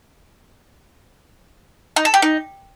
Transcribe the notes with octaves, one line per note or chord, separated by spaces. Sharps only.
D#4
A4
G4
D#4